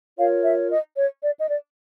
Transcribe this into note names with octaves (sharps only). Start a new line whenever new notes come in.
F4 A#4 C#5 F5
E5
D#5
C#5
D5
D#5
D5